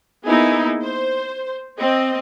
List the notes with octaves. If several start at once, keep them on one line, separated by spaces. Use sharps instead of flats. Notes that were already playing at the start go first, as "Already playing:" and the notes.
A#3 B3 D#4 E4 G#4
C5
C4 D#5